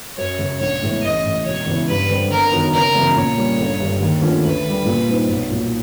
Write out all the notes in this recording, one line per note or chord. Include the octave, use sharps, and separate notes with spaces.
F#2 C#5
C#3 F#3
A#1 C#5
A2 E3 G#3 B3
A1 D#5
A2 E3
E1 C#5
E2 C#3 E3
G2 B4
D3 G3 C4
G1 A#4
F#2 D#3 F#3 B3
F#1 A#4
E2 C#3 F#3
A#2 C#5
G3 A#3 C#4
G1
G2 D3
D#2
D3 F3 A3 C#4
D2 B4
D3 G3
A#2
G3 C4 D#4
B1
A#2 F#3